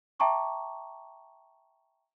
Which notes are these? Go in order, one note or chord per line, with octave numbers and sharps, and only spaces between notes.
E5 G5 A5 A#5 C#6 D6